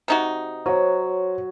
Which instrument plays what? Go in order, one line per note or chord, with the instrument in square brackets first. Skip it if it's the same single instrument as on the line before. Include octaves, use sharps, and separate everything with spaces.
[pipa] C3 D#4 F#4
[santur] F#3 [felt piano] C5 C#5